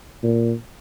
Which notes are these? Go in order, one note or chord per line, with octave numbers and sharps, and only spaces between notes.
A#2